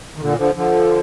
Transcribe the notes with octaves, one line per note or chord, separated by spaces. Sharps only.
D#3
A#2 D3
D3 F3
D3 F3